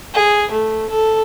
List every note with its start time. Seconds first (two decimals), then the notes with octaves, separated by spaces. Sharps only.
0.14 G#4
0.51 A3
0.89 A4